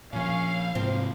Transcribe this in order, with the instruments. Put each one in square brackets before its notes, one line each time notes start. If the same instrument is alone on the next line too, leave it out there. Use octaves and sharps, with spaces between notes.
[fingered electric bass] A#2 F3 [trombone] C#4 [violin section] F5
[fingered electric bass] G#2 C3 [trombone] F3 [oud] C4